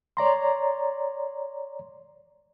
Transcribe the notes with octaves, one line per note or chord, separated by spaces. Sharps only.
C#5 D5 A#5 C6